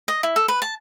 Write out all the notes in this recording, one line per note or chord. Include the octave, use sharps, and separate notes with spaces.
D#5
E4
A4
B4
A5